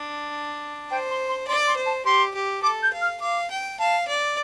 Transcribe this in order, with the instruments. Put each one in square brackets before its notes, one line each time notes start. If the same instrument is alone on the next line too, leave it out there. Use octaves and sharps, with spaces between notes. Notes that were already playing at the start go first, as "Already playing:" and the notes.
Already playing: [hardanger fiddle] D4
[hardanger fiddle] C5 [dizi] G5
[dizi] C6
C6
[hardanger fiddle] D5 [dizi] C6
[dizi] C6
[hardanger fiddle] C5
[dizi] A5
[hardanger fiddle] G4 [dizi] C6
[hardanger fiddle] G4
[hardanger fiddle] A4 [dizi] D6
[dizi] G6
[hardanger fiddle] F5
[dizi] F6
[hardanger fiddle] F5 [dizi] D6
[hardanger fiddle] G5
[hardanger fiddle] F5 [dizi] A5
[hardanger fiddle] D5